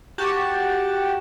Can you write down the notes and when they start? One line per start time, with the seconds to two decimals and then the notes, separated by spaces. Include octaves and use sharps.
0.18 F#4 G4 A5